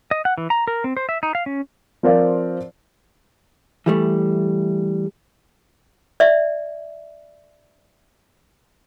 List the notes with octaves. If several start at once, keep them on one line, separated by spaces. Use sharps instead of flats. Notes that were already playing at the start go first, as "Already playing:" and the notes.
D#5
F#5
E3
A#5
A#4
C4
C5
E5
D#4
F5
C#4
F3 C4 A#4 C5 D5 F5
E3 G3 A3
D5 E5